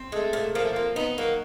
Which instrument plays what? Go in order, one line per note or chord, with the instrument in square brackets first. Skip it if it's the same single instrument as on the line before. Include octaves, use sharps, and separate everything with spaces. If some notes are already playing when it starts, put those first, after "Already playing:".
Already playing: [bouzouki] C4
[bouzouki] G#3 [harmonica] A3
[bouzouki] A#2
[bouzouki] F3 [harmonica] A#3
[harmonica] A3
[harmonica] A#3 [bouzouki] C4
[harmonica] B3 [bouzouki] D#4
[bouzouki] F#3 [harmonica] A#3